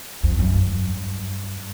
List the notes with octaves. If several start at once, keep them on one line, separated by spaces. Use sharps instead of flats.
F2
F#2
G2